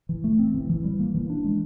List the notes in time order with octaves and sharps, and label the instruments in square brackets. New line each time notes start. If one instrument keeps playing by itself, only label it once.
[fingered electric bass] E3
A3
C4
E3
E3
G3
A#3
E3
D4
G#3